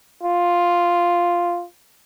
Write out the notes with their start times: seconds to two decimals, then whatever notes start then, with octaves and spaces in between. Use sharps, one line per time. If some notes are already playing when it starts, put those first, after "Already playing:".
0.23 F4